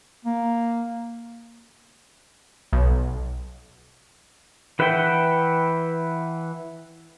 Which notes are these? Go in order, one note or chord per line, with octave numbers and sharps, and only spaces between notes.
A#3
B1
E3 B4 E5 F#5 G5